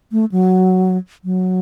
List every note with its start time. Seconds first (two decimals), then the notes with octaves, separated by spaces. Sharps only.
0.12 A3
0.32 F#3
1.24 F#3